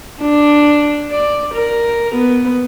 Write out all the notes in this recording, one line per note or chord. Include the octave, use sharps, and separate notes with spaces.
D4
D5
A#4
B3